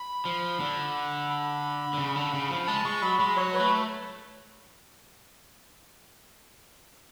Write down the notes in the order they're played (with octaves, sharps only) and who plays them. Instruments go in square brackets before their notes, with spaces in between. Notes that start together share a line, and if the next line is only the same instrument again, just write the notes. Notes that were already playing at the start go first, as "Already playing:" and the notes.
Already playing: [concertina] B5
[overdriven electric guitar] F3
D3
[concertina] B5
[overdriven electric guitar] D3
C#3
D3
C#3
F3
[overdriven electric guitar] G#3 [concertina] A5
[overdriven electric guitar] G#3 [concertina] C#6
[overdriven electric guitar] F#3 [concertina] B5
[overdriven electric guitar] G#3 [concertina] B5
[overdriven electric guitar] F#3 [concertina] C#5
[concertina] B4
[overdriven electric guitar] A3